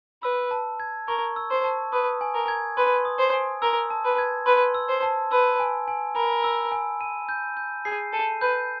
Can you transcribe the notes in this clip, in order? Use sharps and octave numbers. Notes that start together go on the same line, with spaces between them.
B4 E6
A5
G#6
A#4 C#6
E6
C5
A5
B4 D#6
G#5
A#4
G#6
B4 C6
D#6
C5
G#5
A#4 E6
A5
B4
G#6
B4 C6
E6
C5
A5
B4 E6
G#5
G#5
A#4 B5
E6
G#5
D#7
G6
G6
G#4 C7
A4 D#7
B4 G6